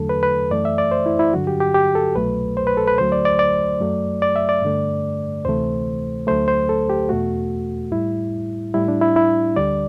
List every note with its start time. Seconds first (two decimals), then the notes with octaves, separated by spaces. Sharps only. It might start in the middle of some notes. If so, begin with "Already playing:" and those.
Already playing: E2 D3 F#3 A3 A4
0.09 B4
0.23 B4
0.51 F#2 E3 A3 D5
0.65 E5
0.78 D5
0.91 C5
1.06 E4
1.19 E4
1.34 G2 D3 F#3 F#4
1.47 G4
1.60 G4
1.75 G4
1.95 A4
2.15 C2 B2 F#3 A3 B4
2.57 C5
2.67 B4
2.77 A4
2.88 B4
2.98 D2 D3 F#3 A3 C5
3.12 D5
3.25 D5
3.39 D5
3.80 F#2 F#3 A3
4.22 D5
4.36 E5
4.49 D5
4.62 G2 D3 A3
5.45 D2 C3 E3 A3 C5
6.27 D2 D3 F#3 A3 C5
6.48 C5
6.69 A4
6.90 G4
7.09 E2 B2 A3 F#4
7.92 A2 G3 E4
8.74 A2 G3 E4
8.88 D4
9.01 E4
9.16 E4
9.56 D2 D3 G3 D5